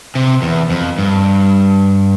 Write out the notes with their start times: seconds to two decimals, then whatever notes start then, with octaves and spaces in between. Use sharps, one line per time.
0.15 C3
0.42 E2
0.70 F2
0.98 G2